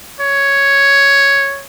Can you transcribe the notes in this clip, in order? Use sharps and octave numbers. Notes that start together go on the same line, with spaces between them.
C#5